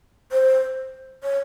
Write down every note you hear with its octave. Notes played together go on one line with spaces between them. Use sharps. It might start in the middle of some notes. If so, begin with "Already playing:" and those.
C5
C#5